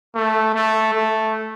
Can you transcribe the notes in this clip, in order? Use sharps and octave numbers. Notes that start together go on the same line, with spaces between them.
A3
A3
A3